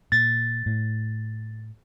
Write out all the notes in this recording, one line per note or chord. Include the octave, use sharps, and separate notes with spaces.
A#2 A6
A2